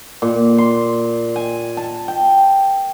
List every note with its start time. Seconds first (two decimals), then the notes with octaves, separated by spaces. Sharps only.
0.22 A#2
0.58 C6
1.36 G#5
1.77 A5
2.08 G5